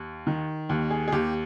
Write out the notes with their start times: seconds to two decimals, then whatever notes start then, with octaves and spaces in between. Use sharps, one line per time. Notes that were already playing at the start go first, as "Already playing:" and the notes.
Already playing: D#2
0.27 D#3
0.69 D#2
0.90 G#4
1.08 G#4
1.12 D#2 G4